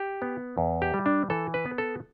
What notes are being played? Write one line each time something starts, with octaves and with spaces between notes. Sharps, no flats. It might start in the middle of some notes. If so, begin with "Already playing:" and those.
Already playing: G4
B3
E2
G4
G3
D4
E3 A4
B4
B3
A4